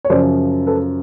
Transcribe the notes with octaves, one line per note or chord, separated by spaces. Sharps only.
C#5
F#2 C#3 F3 C5 D5
A4 B4